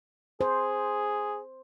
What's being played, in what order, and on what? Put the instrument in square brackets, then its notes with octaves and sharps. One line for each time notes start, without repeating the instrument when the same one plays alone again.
[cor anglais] G#4 [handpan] C5